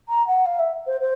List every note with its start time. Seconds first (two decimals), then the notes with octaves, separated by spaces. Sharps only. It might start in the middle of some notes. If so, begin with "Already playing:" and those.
0.08 A#5
0.27 F#5
0.45 F5
0.59 E5
0.86 C5
1.00 C5